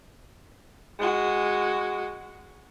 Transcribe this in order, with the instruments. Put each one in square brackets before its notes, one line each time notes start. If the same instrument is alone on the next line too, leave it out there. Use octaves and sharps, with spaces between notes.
[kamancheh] G#3 F#4